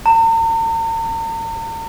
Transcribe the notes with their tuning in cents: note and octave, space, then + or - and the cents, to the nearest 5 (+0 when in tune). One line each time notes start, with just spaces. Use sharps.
A#5 -45